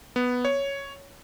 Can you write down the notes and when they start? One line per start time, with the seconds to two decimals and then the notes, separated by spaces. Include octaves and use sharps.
0.16 B3
0.45 C#5